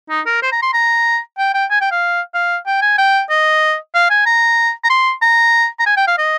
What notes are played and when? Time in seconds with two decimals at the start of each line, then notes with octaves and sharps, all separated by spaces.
0.10 D#4
0.26 A#4
0.43 C5
0.52 A#5
0.63 C6
0.74 A#5
1.38 G5
1.54 G5
1.71 G#5
1.81 G5
1.91 F5
2.35 F5
2.66 G5
2.82 G#5
2.98 G5
3.30 D#5
3.95 F5
4.10 G#5
4.26 A#5
4.84 A#5
4.90 C6
5.22 A#5
5.80 A#5
5.86 G#5
5.97 G5
6.07 F5
6.18 D#5